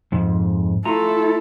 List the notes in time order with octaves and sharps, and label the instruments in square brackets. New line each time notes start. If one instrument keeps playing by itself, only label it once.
[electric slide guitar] F2 G#2
[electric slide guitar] A3 F4 A#5 [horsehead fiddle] E4 A4